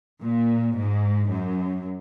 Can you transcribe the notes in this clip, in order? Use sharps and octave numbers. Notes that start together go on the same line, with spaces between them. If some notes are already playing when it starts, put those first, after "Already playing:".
A#2
G#2
F#2